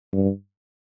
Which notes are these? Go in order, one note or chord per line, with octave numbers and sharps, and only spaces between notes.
G2